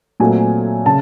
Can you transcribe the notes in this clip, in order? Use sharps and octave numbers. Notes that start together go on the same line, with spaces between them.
A#2 F#3 A3 C4 G#5
C#3 A5